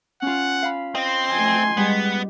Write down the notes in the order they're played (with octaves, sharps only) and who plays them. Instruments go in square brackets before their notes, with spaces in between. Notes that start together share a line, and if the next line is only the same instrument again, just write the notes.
[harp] C#4 F4 [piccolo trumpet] F#5
[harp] F5 B5
[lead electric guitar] C4 [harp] D#5 [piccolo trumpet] C6
[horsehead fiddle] A3 G#5
[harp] G3 [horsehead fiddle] G#3 [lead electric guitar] B3